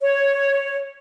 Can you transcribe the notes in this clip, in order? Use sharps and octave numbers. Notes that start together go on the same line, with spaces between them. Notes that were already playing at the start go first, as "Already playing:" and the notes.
C#5